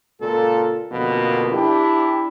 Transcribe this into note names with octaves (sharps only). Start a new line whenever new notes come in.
C#2 A#2 F4 A4
F2 B2 D3 A#3
D4 E4 G4